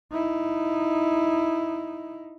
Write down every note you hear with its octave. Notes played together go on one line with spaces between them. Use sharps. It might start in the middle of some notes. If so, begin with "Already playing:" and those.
D#4 E4